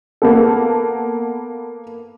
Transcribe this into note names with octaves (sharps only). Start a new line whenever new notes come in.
A#3 B3 A4